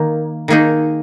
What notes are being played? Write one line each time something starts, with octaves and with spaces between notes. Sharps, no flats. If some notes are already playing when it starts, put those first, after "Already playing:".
Already playing: D#3 A#3 D#4
D#3 A#3 D#4 G#4